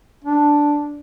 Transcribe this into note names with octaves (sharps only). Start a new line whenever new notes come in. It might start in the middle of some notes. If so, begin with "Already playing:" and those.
D4